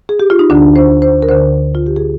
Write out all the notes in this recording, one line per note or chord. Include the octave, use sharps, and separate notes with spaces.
G#4
G4
F4
D#4
D2 D3 D4
C5
C5
A#4
D2 D3 C5
F4
G4
G#4